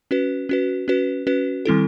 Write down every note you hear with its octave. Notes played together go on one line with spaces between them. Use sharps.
C#4 F#4 B4
C#4 F#4 B4
C#4 F#4 B4
C#4 F#4 B4
D#3 G3 C4 E4 A4